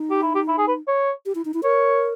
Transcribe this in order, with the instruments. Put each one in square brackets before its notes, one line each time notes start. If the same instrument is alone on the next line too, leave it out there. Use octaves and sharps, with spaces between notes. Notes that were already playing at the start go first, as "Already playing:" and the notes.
Already playing: [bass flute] D#4
[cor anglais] G4
E4
G4
E4
G#4
B4
C#5
[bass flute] G4
E4
D#4
E4
[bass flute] A#4 [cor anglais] C#5